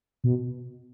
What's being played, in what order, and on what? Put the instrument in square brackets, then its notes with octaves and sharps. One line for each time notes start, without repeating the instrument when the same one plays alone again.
[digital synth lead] B2